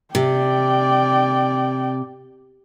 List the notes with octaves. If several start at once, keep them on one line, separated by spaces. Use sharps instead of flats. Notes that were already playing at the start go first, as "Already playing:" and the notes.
C3 D5 G5